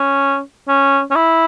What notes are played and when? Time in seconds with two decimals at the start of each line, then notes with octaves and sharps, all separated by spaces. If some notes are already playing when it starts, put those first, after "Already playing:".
Already playing: C#4
0.68 C#4
1.11 C#4
1.16 E4